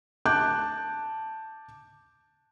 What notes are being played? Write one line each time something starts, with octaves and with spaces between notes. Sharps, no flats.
A5 D6 F#6 G6